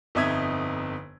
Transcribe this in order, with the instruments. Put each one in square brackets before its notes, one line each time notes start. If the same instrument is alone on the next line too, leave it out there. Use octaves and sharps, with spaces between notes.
[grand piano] G1 F2 D#4 E5 D#6 G#6